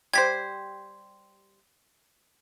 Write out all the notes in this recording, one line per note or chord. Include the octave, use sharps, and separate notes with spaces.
G3 G4 C5 G#6 B6